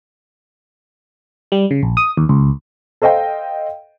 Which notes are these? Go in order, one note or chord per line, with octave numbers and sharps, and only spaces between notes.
G3
C#3
A#1
D#6
D#2
C#2
A4 C5 D#5 F5 G5